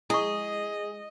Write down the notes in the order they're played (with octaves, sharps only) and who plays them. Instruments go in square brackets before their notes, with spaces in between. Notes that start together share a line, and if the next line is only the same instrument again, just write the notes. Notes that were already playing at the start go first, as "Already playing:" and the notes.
[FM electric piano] G#3 [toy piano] E4 C#6 [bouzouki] G#4 [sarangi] D#5